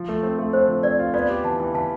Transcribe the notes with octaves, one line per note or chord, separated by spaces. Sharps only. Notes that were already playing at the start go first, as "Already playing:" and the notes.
Already playing: F3
A3
C4
A3
C4 C5
F3
C4 B4 D5
F4
B3 D5 F5
G4
E3 F5 A5
E3
E3 F5 A5